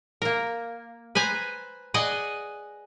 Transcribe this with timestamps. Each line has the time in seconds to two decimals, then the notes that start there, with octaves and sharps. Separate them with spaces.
0.22 A#3 A#4
1.15 B4 C5 G#5 A#5
1.94 G#4 D5 D#5 F#5